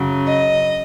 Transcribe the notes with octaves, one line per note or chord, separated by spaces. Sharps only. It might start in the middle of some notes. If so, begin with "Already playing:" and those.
Already playing: F#2 C#3 F#3
D#5